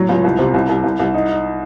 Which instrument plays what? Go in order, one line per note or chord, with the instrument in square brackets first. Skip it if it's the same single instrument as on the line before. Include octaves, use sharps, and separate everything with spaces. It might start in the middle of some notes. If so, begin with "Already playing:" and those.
Already playing: [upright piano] A2 F#3
C#2
C2
C3
C2
C2
C2
C2
D#4
D#4